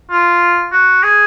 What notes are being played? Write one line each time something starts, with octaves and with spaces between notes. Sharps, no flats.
F4
F#4
G#4